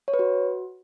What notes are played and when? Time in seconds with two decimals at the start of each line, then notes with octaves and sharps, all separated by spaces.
0.08 C#5
0.14 B4
0.19 F#4